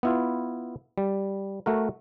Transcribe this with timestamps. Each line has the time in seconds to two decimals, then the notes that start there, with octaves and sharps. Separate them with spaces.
0.03 B3 E4 F4
0.98 G3
1.66 A3 F#4 A#4